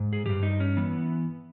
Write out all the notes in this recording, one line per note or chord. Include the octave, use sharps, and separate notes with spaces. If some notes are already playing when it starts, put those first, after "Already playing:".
Already playing: G#2
G#4
G2 E3 G4
D#4
C#4
E3 B3